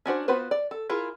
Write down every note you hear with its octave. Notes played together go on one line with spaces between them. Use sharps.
C#4 D4 F#4 C5
B3 F4 F#4 B4 C5
D5
A4
E4 F4 G#4 A#4